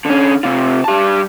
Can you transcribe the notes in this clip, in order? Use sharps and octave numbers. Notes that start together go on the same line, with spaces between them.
D3 C#4
C3 F4
G3 A5